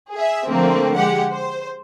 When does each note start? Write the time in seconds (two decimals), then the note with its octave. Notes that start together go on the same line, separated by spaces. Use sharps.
0.13 G#4 E5
0.48 D3 F3 A3 A#3 C4
0.97 G#3 G4 F#5
1.32 C5